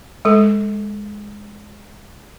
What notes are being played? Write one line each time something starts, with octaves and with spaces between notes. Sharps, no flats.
G#3 A4